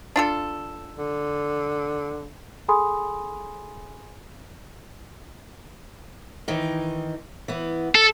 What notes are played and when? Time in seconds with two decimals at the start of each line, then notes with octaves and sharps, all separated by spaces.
0.16 D4 F4 A4
0.98 D3
2.68 G#4 A4 G#5 B5 C6 D#6
6.48 D#3 E3 D#4
7.48 E3 B3
7.95 A4